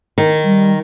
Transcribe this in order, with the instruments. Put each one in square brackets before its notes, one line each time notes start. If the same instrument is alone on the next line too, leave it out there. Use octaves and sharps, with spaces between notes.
[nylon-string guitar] D#3
[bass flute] G3